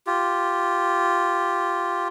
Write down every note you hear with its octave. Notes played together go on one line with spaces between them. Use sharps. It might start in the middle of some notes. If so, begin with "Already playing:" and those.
F4 G4